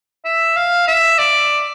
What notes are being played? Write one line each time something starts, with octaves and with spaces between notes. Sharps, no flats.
E5
F5
E5
D5